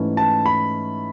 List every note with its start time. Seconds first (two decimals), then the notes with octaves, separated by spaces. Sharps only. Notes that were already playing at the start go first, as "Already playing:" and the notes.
Already playing: G#2 E3 A3 C#4 E4
0.17 A5
0.46 B5